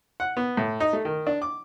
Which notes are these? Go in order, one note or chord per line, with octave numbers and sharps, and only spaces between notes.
F#5
B3
A2
D#4
A3
D#3
D4
D6